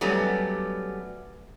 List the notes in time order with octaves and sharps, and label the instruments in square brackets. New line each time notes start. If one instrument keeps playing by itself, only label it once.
[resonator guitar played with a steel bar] F#3 G3 A3 B3 C#4 G4